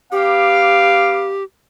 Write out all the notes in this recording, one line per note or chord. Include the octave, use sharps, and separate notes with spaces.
B3 G4 F5 D6